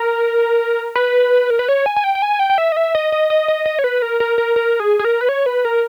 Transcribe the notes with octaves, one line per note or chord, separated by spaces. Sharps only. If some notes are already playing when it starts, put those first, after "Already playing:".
Already playing: A#4
B4
A#4
B4
C#5
G#5
G#5
G5
G5
G#5
G5
G5
E5
D#5
E5
D#5
D#5
D#5
D#5
D#5
C#5
B4
A#4
A#4
A#4
A#4
G#4
G#4
A#4
B4
C#5
B4
A#4